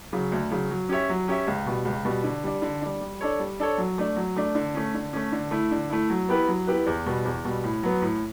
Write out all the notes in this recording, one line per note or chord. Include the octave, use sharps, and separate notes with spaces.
C#3 F#3
D2
C#3 F#3
F#3
C#4 G4 C#5 E5
F#3
C#4 G4 C#5 E5
C#2
B2 G3
C#2
B2 G3
D3
G3 D4
D3
G3 D4
G3
D4 A4 C#5
G3
D4 A4 C#5
F#3
A3 D4
F#3
A3 D4
D3
A3 C#4
D3
A3 C#4
D3
A3 E4
D3
A3 E4
F#3
B3 E4 G4 B4
F#3
B3 E4 G4 B4
E2
B2 G3
E2
B2 G3
A2
F#3 B3
A2